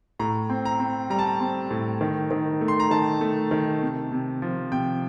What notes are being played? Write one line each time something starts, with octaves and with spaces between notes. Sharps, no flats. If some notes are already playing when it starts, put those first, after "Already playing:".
A2 A#5
C4
A#5
C4
G3 A#5
A5
A#5
C4
A2
D#3
D#3
A3
C6
A#5
D#3 A5
A3
D#3
C3
C3
F3
C3 G5